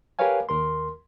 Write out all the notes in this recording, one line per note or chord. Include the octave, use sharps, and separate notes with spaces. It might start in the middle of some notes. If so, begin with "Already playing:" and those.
G4 A#4 B4 C#5 F5 G#5
D#2 A#4 C6